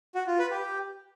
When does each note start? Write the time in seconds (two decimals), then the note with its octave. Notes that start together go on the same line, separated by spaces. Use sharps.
0.15 F#4
0.27 F4
0.39 B4
0.51 G4